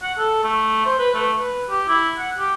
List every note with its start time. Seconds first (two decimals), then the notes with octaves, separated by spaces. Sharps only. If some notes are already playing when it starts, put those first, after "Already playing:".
0.02 F#5
0.18 A4
0.44 A3
0.86 C5
0.99 B4
1.14 A3
1.39 B4
1.70 G4
1.88 E4
2.18 F#5
2.38 G4